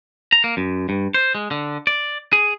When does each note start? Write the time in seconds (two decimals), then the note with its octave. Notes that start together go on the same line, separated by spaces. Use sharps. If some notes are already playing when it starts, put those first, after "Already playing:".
0.32 A#5
0.44 A#3
0.57 F#2
0.89 G2
1.14 C5
1.35 G#3
1.51 D3
1.87 D5
2.33 G#4